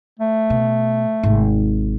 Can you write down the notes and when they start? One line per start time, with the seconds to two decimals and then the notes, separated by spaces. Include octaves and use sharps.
0.19 A3
0.50 B2
1.23 G#1 C3